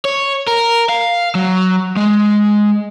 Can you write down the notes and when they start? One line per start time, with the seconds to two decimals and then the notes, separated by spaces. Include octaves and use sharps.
0.05 C#5
0.47 A#4
0.89 F5
1.35 F#3
1.97 G#3